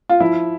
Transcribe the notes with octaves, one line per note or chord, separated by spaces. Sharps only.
F4
F3 E4